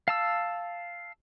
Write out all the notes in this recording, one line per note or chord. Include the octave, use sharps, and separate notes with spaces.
F5 A5 E6